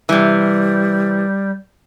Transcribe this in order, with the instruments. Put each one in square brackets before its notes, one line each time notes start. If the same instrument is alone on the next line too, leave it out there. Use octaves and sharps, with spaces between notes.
[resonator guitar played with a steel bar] C3 E3 [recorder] G3